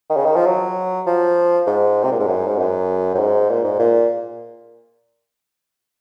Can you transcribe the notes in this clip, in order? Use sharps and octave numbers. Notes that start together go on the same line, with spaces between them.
D#3
C#3
D#3
F3
F#3
F3
G#2
C3
A#2
G#2
F#2
G#2
F#2
F#2
G#2
A#2
G#2
A#2